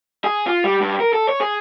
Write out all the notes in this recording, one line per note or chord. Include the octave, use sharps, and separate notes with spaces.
G#4
F4
G3
G2
A#4
A4
C#5
G#4